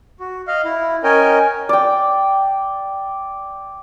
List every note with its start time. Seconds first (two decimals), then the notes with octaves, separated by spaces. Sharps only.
0.20 F#4
0.47 D#5 F5 F6
0.65 E4
1.03 C#4 A#4 C#5 D#5 G5 G#5
1.69 D5 G5